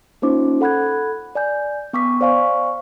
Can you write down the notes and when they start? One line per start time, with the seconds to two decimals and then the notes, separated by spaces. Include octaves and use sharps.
0.22 A#3 C#4 D#4 F4 C5 D6
0.61 A4 F#5 B5 F#6 G#6
1.35 D5 G#5 G6
1.93 B3 G5 C#6 D6 E6 B6
2.21 C5 D5 F5 G#5 C#6